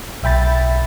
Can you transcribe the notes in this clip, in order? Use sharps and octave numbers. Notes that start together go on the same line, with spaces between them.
B1 E5 G5 B5 A6